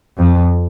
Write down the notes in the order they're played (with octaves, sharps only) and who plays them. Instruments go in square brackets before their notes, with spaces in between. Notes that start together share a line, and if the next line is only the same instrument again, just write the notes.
[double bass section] F2